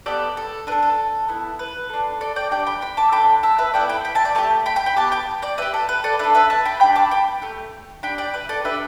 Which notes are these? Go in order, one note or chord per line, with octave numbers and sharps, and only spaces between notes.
B3 G4 A4 D5
A4
D4 A4 B4
A4
B3 E4 A4
B4
D4 A4
A4 D5
D5 G5
D4 G4 D5 G5
G5 B5
G5 B5
A5 D6
D4 A4 G5 B5
E5 A5
B4 E5
B3 E4 A4 D5 G5
G5 B5
G5 B5
E5 A5
D5 G5
A3 G4 E5 A5
G5 B5
G5 B5
G5 B5
B3 G4 A5 D6
G5 B5
D5 G5
D4 G4 B4 E5
A4
B4
A4 D5
D4 A4 B4 E5
B4 E5
E5 A5
G5 B5
D4 G4 G5 B5
A5 D6
G5 B5
A3 G4
D4 G4 G5 B5
D5 G5
B4 E5
A4 D5
D4 G4 B4 E5